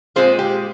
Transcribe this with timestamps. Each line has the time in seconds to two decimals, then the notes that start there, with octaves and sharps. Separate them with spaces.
0.16 A#2 G#3 C4 F4 G#4 C5
0.39 G4